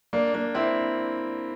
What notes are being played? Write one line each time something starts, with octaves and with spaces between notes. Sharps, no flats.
A#3 D4
A#3 D4
C4 E4